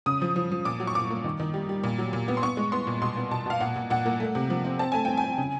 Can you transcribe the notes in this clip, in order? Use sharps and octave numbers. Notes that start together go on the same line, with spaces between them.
C#3 D#6
F3
F3
F3
A#2 D6
F#3
C#6
A#2 D6
A#3
D#3
D#3
G3
G3
A#2
F#3
A#2
B3
C6
B3 C#6
G#3
B3 C6
A#2
B2 C6
B3
B2 A5
B2 F5
A#2 F#5
A#2
A#2 F#5
A#3
A3
C3
F3
C4
C4 A5
A3 G#5
C4 G5
G#5
C4
C#3